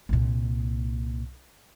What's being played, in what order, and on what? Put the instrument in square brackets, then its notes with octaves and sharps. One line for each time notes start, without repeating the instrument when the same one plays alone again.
[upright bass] C2 A#2